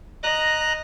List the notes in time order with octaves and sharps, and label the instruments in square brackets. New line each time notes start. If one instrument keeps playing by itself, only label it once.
[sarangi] D#5 [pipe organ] A#5 F#6